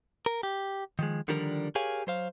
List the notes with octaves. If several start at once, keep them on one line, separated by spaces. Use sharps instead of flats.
A#4
G4
D#3 F3 G#3
D3 D#3 F3 G3 D4 A#4
G4 G#4 A#4 C#5 F5 G#5
F#3 C5 F5